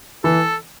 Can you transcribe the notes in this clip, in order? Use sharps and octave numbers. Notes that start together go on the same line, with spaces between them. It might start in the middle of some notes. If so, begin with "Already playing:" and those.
E3 A4